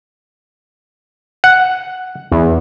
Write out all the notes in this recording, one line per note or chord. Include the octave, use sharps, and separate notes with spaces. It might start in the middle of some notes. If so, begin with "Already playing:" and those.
F#5
E2